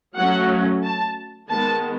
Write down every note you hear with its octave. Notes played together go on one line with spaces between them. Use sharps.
F#3 A3 C#4 F#5
A5
D#3 G#3 B3 A5